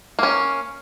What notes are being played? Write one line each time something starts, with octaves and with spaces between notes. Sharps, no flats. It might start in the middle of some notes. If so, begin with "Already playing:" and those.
A#3 C#4